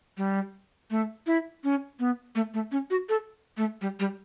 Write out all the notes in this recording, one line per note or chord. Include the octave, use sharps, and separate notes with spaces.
G3
A3
E4
C#4
B3
A3
A3
C#4
F#4
A4
A3
G3
G3